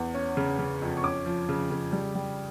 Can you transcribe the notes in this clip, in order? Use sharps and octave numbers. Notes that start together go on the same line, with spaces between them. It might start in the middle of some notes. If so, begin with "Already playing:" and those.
Already playing: E2
C#4
C#3
C#3
F2
C#6
C#4 D6
F3
C#3
C#3
G3
G3